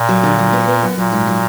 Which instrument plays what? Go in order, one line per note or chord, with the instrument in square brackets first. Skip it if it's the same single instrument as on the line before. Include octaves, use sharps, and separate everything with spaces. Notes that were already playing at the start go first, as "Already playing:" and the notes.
Already playing: [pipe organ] A#2
[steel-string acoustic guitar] F#3
D3
F#3
B3
B3
F#2
[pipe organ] A#2 [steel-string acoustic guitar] F#3
[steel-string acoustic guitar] G#2
F#3